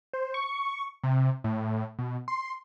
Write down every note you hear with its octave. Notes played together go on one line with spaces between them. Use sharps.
C5
C#6
C3
A2
B2
C6